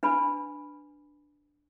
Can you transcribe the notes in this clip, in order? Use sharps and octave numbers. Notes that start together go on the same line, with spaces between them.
D4 B4 G#5 B5